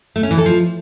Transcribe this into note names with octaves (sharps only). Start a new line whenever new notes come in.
A3
C#4
E3
A4
F3